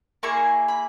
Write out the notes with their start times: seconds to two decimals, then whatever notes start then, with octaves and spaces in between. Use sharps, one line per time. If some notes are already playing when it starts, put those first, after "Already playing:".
0.23 A#3 E4 G#4 C#6
0.68 B5